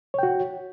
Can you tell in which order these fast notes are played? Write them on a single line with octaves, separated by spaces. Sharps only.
C#5 G5 F#4